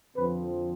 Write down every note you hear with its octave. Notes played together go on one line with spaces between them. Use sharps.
F2 D3 F3 C4 B4